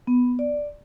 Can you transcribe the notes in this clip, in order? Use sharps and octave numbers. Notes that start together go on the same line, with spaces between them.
B3
D5